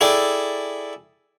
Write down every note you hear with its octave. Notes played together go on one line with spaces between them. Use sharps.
E4 G#4 A4 D5 G5